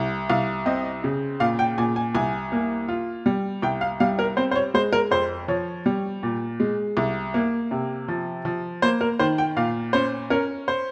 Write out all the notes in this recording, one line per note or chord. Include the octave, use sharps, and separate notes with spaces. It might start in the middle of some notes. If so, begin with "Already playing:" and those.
Already playing: C2
C2 F5
C4 D#5
C#3
A#2 F5
G5
A#2 G#5
G#5
C2 G#5
A#3
F4
G3
C2 G5
F5
G3 F5
A#4
C4 C5
C5
C#5
G#3 C5
A#4
F2 C5
F3 C#5
G3
A#2
G#3
C2
A#3
C3
F3
F3
A#3 C5
A#4
D#3 C5
G5
A#2 F5
C#4 C5
C#4 A#4
C5